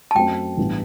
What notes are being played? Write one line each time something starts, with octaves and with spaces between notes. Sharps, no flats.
A5
F#2 F#3 A3 C4 G5
A1 G2 E3 B3